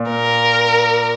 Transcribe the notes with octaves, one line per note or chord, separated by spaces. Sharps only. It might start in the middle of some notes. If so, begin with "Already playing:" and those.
Already playing: A#2
A#4